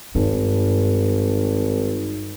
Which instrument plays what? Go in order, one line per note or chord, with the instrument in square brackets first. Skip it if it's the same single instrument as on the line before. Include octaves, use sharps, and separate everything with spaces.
[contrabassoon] G#1 [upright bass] G2